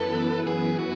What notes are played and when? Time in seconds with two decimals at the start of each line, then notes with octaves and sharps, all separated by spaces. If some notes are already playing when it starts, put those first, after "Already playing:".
Already playing: F#2 E3 B3 E4 A4 B4
0.47 G#4
0.79 F#4